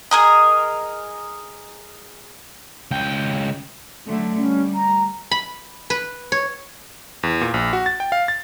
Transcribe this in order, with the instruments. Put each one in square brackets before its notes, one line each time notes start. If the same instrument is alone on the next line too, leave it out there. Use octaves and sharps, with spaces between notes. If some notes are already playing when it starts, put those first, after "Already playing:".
[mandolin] G#4 A#4 D#5
[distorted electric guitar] C#2 G5
[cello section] D3 F#3 A3
[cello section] G3 [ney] C#4
[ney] A#5
[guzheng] B5
B4
C#5
[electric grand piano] E2
A#2
A#1
F#4
A6
G5
F5
A6